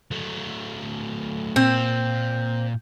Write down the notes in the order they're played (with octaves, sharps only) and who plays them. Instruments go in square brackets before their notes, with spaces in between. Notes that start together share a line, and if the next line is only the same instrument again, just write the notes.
[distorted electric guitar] F#3 A3
[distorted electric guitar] A#2 [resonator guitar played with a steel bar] C4